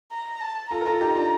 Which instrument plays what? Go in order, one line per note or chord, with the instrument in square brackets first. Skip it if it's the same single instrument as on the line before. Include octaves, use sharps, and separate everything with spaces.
[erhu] A#5
A5
[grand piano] F4 A4 [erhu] A#5
[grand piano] A#4
F4 A4
D#4 G4
D4 F4